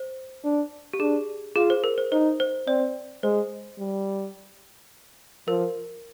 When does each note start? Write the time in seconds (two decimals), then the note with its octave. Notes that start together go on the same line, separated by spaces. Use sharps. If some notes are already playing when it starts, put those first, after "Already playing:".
Already playing: C5
0.44 D4
0.93 G4
1.00 D4 G#4
1.56 F4 G#4
1.70 C5
1.84 A#4
1.98 C5
2.12 D#4 C5
2.40 C5
2.67 C4 D5
3.23 G#3 C5
3.79 G3
5.48 F3 A#4